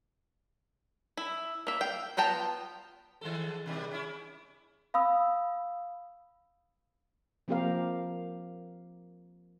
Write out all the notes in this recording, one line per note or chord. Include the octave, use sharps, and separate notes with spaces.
E4
A#3 E5
F5 G5
B3 F4 G5 A5 A#5
D#3 G#3 A4
B2 D#3 G3
C#4 E4
F5 B5 D#6 E6
F3 A#3 C4 G4 A#4 F5